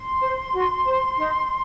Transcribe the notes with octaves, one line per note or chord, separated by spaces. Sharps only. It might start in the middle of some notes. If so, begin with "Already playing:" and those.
Already playing: C6
C5
F#4
C5
D#4